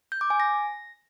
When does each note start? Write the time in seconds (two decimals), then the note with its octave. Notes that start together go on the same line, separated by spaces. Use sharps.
0.12 G6
0.21 D6
0.30 G#5
0.40 A#6